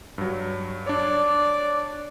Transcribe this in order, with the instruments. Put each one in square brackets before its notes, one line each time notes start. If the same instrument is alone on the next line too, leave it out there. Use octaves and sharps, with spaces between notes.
[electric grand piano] G2 F#3
[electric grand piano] D4 C#5 [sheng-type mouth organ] D5